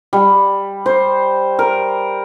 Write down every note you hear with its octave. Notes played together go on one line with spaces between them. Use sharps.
G3
C5
A#4